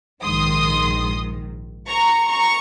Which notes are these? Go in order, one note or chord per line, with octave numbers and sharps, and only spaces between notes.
A#1 G#2 D#3 C6 D#6
A#5 C#6
A#5 C#6